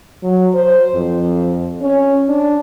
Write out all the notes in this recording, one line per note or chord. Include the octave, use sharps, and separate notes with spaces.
F#3
C5
F2
C#4
D4